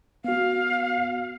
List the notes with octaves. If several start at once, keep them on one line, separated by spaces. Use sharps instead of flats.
B3 F#4 F5